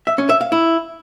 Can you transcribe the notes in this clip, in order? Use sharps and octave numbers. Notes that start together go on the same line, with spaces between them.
E5
C#4
E5
F5
E4